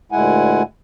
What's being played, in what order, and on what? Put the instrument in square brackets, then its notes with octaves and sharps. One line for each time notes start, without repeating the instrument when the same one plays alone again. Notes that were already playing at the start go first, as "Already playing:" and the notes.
[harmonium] D2 A#2 G#3 E4 F#5 G#5